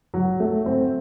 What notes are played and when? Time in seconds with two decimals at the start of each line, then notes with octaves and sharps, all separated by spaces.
0.14 F#3
0.40 A3
0.66 C4